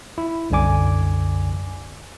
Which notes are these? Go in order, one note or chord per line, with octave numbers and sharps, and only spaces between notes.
E4
C2 F#2 D3 D5 G#5 D6